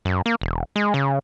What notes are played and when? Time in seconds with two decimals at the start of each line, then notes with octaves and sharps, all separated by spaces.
0.05 F#2
0.26 A#3
0.41 E1
0.76 G#3
0.94 C#3